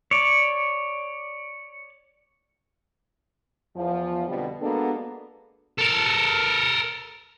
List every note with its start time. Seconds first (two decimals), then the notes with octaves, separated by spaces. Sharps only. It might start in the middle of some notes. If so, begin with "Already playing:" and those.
0.11 C#5 D5
3.76 E2 F3
4.27 F2 B2 D3 G3
4.61 G#3 A#3 B3 D4 F#4 A4
5.79 A4 A#4